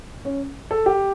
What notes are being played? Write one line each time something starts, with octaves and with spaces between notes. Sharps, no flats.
C#4
A4
G4